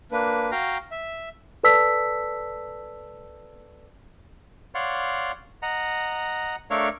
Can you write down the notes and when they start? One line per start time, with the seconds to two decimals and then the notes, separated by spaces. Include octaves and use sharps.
0.12 A#3 D4 B4
0.51 F#4 F5 G5 A#5
0.91 E5
1.63 A4 B4 D5 A5 E6 B6
4.75 C#5 D5 F5 F#5 C6
5.62 D#5 F#5 A#5
6.70 A3 D4 A4 A#4 C#5 F5